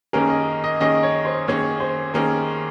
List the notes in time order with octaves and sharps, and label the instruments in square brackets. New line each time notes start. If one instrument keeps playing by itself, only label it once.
[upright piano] F#2 D#3 A#3 C#4 G#4 [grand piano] A#4
[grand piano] D#5
D#5
[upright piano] F#2 D#3 A#3 C#4 G#4 [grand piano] D#5
[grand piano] C#5
C5
[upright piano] F#2 D#3 A#3 C#4 G#4 [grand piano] C#5
[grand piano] C5
[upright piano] D#3 A#3 C#4 G#4 [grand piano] A#4